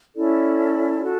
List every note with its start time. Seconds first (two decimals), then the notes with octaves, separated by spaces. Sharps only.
0.15 C#4 E4 A4 D5
1.02 F#4 A4